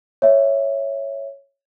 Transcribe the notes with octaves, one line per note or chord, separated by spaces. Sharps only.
C#5 E5